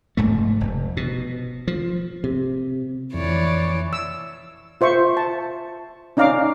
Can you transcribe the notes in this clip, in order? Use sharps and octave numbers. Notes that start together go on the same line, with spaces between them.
F1 G#2 A3
F1
B2
F3
C3
F2 E3 C#5 D5
E6
F4 C5 E5 C#6
A5
C#4 D#4 D5 F5 A#5 D6